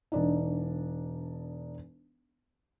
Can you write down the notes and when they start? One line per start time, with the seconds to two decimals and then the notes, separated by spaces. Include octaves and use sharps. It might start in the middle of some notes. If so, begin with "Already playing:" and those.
0.12 E1 D4 D#4